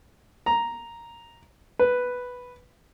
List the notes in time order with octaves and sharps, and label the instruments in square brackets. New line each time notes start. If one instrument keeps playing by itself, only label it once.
[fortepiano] A#5
B4